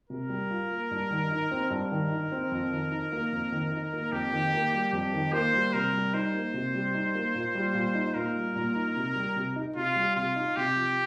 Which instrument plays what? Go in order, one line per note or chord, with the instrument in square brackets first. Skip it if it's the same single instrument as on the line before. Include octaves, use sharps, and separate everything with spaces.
[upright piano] C3 [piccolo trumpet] A#4
[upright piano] G3
F4
A#3
G2
D#3
D#4
C4
[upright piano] G2 [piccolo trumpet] A#4
[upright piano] D#3
D#4
C4
F2
D#3
D#4
A#3
F2
D#3
D#4
A#3
[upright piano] F2 [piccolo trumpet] G4
[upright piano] D#3
A#3
G3
[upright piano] F2 [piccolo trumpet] G4
[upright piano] D#3
[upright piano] A#3 [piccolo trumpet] C5
[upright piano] G3
[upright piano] C3 [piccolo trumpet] A#4
[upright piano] G3
[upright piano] D#4 [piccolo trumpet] C5
[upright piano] A#3
C3
G3
D#4
A#3
A#2
G3
A#2
D#4
[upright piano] A#2 [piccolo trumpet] A#4
[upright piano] G3
A#2
D#4
C3
G3
C3
D#4
[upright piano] C3 [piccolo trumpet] F4
[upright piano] G3
[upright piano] C3 [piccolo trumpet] F4
[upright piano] D#4
[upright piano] C3 [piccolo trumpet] G4
[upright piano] F3